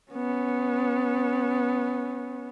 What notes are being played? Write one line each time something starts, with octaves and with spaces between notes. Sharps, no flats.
B3 C#4